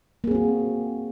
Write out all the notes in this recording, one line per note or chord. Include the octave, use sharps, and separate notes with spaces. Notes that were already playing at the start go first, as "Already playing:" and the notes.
A#3 C4 F#4 G#4